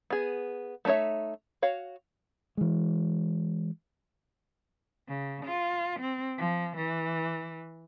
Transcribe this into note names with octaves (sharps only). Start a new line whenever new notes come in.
B3 G#4
A3 D4 D#4 C#5 E5
F#4 C#5 F5
E3 G#3
C#3
F4
C4
F3
E3